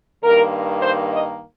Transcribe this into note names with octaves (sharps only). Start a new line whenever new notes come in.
G2 D#3 A#3 A#4
C5
D#5